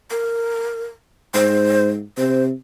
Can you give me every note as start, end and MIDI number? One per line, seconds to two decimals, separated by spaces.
0.11 0.86 70
1.34 2.02 44
1.34 1.89 72
2.18 2.52 48
2.18 2.44 72